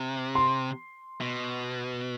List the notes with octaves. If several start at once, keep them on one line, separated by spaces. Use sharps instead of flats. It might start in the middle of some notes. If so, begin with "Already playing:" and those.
Already playing: C3
C6
B2